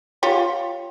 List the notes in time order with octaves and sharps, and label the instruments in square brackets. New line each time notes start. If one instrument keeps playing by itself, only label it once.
[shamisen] F4 G4 C#5